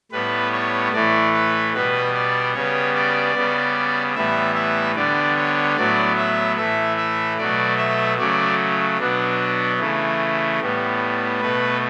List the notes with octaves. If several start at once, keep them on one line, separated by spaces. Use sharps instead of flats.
A2 G3 B3 B4
C#5
A2 E3 A3 D5
B4
B2 G3 B3 B4
D5
C#3 G3 B3 C#5
D5
C#3 G3 B3
A2 E3 G3 B3 E5
E5
D3 G3 B3 D5
C#5
A2 F#3 B3 D5
E5
A2 E3 A3 E5
E5
B2 F#3 A3 D5
E5
C#3 F#3 A3 D5
B2 F#3 B3 D4
C#3 E3 A3
A2 G3 B3
B2 A3 B4